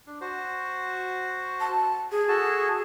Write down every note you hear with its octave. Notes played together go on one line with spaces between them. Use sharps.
D4
F#4 C5
A5
G#4
F#4 A4 A5